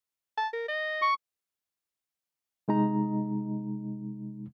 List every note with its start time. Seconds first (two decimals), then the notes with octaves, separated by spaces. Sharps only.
0.37 A5
0.53 A#4
0.68 D#5
1.02 C#6
2.68 C3 G#3 D#4 A#5